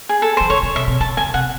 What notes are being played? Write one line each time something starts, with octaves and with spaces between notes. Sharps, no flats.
G#4
A4
D#3 C5
C#3 C#5
C#3
C3 E5
C3
C#3 A5
C#3 G#5
C3 F#5